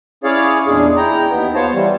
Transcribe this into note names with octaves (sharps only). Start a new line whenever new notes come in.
C#4 E4 G#4 C#5 D5 F5
E2 A#2 G#3 D4 G#4
E4 G5 A#5
D#2 B3
B3 F4 C5 C#5 A5
E3 G3